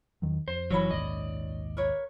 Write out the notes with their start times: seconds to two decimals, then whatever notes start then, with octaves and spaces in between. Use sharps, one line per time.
0.22 E2 D#3 F#3
0.48 F2 C5
0.70 F#1 E3 F#3 C#4 C#5 B5
0.91 A#1 D#2 G#2 D5 D#5
1.77 A#4 B4 C#5